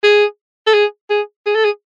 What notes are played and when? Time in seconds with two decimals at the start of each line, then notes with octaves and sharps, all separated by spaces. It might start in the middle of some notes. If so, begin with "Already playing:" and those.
0.03 G#4
0.67 A4
0.74 G#4
1.10 G#4
1.46 G#4
1.55 A4
1.65 G#4